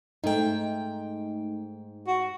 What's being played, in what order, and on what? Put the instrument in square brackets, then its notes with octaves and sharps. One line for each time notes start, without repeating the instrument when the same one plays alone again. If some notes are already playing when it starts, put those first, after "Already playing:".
[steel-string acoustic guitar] G#2 G5 [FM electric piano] A3 D#4
[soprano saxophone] F#4